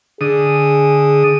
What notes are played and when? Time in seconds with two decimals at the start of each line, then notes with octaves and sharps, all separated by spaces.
0.21 D3 G#4 D#6